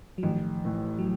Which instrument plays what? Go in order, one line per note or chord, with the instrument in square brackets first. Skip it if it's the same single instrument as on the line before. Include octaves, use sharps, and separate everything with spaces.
[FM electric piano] F#3
[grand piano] A1 [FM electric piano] D#3 F3
[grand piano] A2 E3
[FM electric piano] F#3